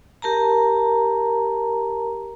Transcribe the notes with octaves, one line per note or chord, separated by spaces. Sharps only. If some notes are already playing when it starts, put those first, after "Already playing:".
G4 A#4 A5 A#5